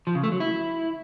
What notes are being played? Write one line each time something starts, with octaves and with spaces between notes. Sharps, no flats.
F3
C#3
A3
F#3
E4